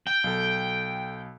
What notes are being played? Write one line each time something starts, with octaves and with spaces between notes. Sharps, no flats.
G5
B1 A4